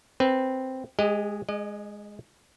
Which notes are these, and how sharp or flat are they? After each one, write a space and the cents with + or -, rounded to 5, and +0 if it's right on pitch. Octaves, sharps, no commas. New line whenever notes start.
C4 +0 B4 +0
G#3 +0 G4 +40 D#5 +0
G#3 +0 D#5 -40